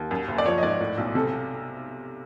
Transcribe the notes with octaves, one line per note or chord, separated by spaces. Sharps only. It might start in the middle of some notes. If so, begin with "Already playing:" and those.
Already playing: D#2
F#2
F#1
D5
F3 C#5
D#5
G#2 D5
A2
B1
C3 A4